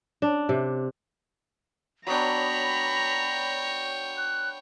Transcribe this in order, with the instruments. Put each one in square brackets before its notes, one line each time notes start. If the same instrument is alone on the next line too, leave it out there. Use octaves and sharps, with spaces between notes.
[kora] D4
C3
[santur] F#3 B3 D4 [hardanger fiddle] C#5 G5 [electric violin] A#5 [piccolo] B5
[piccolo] F#6